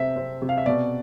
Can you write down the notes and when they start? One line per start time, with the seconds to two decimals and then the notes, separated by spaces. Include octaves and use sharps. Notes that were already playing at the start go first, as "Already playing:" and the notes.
Already playing: C3 C4 E5
0.16 C4
0.42 C3
0.49 F5
0.58 E5
0.66 B2 D5